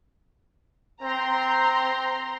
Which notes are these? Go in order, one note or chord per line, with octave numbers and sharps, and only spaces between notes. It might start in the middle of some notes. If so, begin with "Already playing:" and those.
C4 A#5 C6